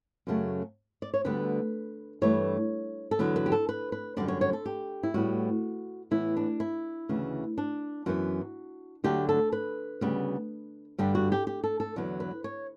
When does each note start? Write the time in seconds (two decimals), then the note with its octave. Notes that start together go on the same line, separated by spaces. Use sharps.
0.27 F#2 C#3 F#3 A3
1.02 D5
1.14 C#5
1.25 D2 D3 G3 B3 B4
2.22 G2 E3 A3 C#5
3.11 A4
3.19 E2 D3 F#3 B3 B4
3.36 B4
3.46 G4
3.52 A4
3.69 B4
3.92 B4
4.17 F#2 D3 G3 D5
4.28 C#5
4.41 C#5
4.53 A4
4.66 G4
5.03 E4
5.14 A2 G3 B3 F#4
6.11 A2 E3 B3 E4
6.37 D4
6.60 E4
7.09 D2 C#3 E3
7.58 D4
8.06 F#2 E3 B3 F#4
9.04 D2 D3 F#3 A3 G4
9.29 A4
9.52 B4
10.01 D2 C#3 G3 B3
10.99 G2 D3 G3 G4
11.15 F#4
11.32 G4
11.47 G4
11.64 A4
11.80 A4
11.96 E2 D3 F#3 B3
12.20 B4
12.44 C#5